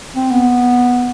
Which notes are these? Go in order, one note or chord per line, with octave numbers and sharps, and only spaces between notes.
C4
B3